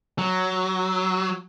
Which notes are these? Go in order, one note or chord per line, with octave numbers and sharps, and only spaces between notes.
F#3